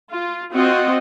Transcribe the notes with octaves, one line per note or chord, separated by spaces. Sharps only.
F4
C4 F4 F#4 D#5